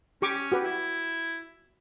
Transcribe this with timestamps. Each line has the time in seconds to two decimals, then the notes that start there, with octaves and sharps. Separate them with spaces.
0.22 C#4 G4 C#6 D6
0.52 F#4 G4 B4
0.64 E4